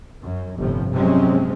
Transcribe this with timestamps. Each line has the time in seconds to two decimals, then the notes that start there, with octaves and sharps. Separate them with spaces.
0.23 F#2
0.58 G1 A2 C3 F3
0.92 C3 F3 F#3 G#3 C4 C#4